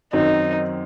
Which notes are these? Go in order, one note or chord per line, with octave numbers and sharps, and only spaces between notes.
F#2 D#3 F#3 C4 D#4